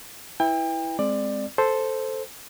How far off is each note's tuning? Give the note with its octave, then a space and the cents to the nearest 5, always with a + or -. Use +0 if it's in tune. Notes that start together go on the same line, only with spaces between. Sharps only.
E4 -5 B4 +0 G5 +35
G#3 +0 C4 +0 D5 +15
A4 +0 C5 +0